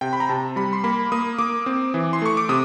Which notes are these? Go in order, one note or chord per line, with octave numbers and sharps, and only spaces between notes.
C3 G5
B5
A#5
C3 A5
G3 B5
C6
A#3 B5
A#3 D#6
A#3 D6
C4
E3
C6
A3 C#6
D6
C3 D#6